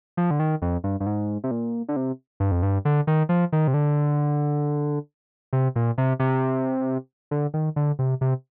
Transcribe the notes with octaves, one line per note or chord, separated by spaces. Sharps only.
F3
D3
D#3
F2
G2
G2
G#2
C3
A#2
D3
C3
G2
F2
G2
D3
D#3
F3
D#3
C3
D3
C3
A#2
C3
C3
D3
D#3
D3
C3
C3